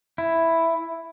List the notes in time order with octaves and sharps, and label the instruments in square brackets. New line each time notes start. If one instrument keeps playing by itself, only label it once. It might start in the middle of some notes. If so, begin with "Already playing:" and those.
[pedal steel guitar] E4